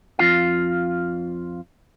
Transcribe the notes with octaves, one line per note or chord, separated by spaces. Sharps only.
F2 F4 F5